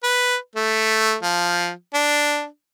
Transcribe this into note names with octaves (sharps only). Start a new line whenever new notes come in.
B4
A3
F3
D4